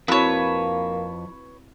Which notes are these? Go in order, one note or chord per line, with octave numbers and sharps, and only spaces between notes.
F2 A#3 C4 E4 F#4 B4 C#5 A5